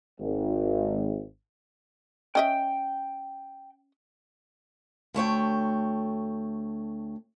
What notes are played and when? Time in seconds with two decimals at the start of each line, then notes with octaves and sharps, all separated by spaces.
0.20 G#1
2.35 C#4 D#5 E5 G5
5.14 D2 A3 C#5 G5